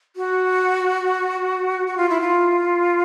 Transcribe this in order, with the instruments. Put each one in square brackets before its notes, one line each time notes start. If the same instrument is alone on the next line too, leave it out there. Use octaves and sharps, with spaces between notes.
[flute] F#4
F#4
F4
E4
F4